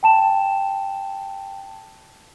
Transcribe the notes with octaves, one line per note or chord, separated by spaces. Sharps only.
G5 A5 E7